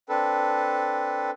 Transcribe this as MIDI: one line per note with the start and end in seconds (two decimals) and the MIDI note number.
0.09 1.31 60
0.09 1.31 62
0.09 1.31 69
0.09 1.31 71